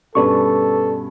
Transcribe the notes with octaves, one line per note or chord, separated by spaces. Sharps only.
G2 B2 C#4 A4 B4 D5 C#6